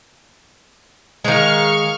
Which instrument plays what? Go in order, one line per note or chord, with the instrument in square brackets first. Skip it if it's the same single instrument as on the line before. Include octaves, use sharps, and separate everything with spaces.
[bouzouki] D#3 G#3 [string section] F5 C#6 F6